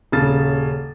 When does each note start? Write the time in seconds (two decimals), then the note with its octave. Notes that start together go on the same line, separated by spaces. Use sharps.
0.12 D#1 C#3 A6